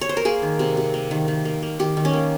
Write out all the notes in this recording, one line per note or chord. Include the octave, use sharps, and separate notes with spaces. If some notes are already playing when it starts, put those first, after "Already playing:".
C#5
C5
A#4
A#3 G#4
D#3
C3
C3
A#3
D#3
D#3
A#3
A#3
D#3 G4
D#3
C#4
A#3